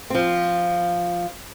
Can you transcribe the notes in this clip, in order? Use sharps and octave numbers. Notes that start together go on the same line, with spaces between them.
F3 C4